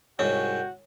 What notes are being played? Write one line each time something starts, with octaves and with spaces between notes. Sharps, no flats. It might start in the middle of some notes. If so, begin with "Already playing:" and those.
C2 G#2 C#4 F#4 C#5 G5